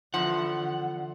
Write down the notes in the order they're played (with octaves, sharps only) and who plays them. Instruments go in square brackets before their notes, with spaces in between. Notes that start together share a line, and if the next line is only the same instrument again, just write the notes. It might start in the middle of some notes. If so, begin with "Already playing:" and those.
[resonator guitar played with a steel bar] E2 F3 [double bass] D3 [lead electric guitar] F#5